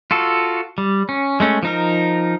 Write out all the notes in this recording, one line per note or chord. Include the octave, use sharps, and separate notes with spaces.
F4 F#4 A4
G3
C#4
G#3 A3 C#4
F3 D#4 A#4